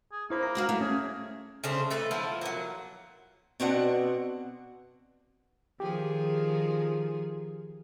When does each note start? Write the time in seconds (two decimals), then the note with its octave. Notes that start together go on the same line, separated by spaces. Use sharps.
0.12 G#4
0.30 A#3 E4 C5 B5
0.43 A#5
0.55 D4 F#4 F5
0.69 A3
0.81 C#4 G#4
1.64 C#3 A3 D4 C5
1.91 A3 A4 B4
2.11 F3 A3 B3 E4
2.41 F#3 A#3
3.60 B2 C4 D4 F#5
5.80 D#3 F3 G4 G#4